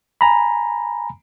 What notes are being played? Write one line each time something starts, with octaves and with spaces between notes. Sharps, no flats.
G#5 A#5 B5